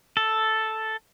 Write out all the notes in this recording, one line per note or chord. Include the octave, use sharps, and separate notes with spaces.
A4